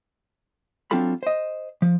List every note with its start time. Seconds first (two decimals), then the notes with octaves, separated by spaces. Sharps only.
0.91 F#3 C4 D4 F4 A4 B5
1.23 C5 D#5
1.82 F3